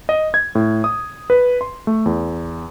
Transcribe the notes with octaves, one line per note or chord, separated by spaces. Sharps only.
D#5
G#6
A2
D#6
B4
C6
A3
E2